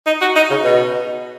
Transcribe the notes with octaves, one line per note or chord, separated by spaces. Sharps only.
D#4
F#4
D#4
C#3
B2